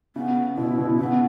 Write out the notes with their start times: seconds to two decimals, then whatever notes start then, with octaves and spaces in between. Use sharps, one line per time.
0.16 C#3 B3
0.57 B2 E4
0.78 B2
0.99 C#3 B3